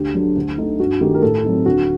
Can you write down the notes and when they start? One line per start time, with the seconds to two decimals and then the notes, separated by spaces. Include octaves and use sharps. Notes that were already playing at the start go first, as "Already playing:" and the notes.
Already playing: D2 G4
0.15 D3 F#3
0.36 D2
0.58 D3 A3 D#4
0.79 G2 F#4
1.01 D#3 A3 D#4 G4
1.14 A#4
1.22 A2 A4
1.44 F#3 C4 D#4
1.66 D2 F#4